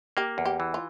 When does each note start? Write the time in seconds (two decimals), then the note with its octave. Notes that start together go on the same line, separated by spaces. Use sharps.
0.17 A#3 G4
0.38 E2
0.46 G4
0.60 E3
0.74 F4